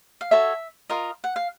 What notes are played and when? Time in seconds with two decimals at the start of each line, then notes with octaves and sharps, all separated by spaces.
0.21 F5
0.31 F#4 A4 C#5 E5
0.90 F4 A#4 D#5
1.24 F#5
1.36 F5